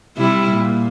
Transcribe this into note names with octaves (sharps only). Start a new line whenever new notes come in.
C3 G3 E4
A#2